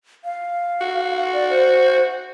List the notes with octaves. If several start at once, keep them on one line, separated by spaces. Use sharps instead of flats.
F5
F#4
D5
C5